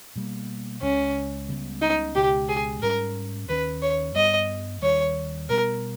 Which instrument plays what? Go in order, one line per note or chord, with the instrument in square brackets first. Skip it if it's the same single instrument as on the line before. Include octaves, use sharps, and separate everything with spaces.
[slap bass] B2 G3 A#3
[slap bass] C#2 C#3 G#3 [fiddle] C#4
[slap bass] C#2 C#3 G3 B3
[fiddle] D#4
[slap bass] C#2 B2 G#3 [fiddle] G4
[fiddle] G#4
[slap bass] G#2 G3 C#4 [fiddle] A#4
[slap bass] D#2 D#3 G3 C#4 [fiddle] B4
[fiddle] C#5
[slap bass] G2 G3 B3 [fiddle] D#5
[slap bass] D#2 D#3 G3 [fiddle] C#5
[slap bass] B2 G3 B3 [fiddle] A#4